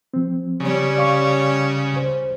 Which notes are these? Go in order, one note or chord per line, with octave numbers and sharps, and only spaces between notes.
F3 C4
C#3 G3 C#4
D5 F5 C#6
C#2 C5